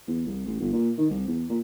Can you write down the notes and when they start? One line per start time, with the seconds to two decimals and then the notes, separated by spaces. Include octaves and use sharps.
0.07 E2
0.27 C2
0.46 A1
0.60 G1
0.73 A#2
0.98 D#3
1.10 C2
1.27 E2
1.50 A#2